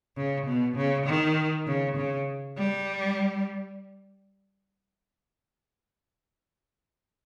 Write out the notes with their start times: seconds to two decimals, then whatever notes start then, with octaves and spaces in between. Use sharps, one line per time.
0.17 C#3
0.46 B2
0.76 C#3
1.06 D#3
1.67 C#3
1.97 C#3
2.57 G3